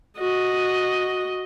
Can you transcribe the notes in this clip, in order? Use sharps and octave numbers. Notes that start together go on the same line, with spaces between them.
F#4 D#5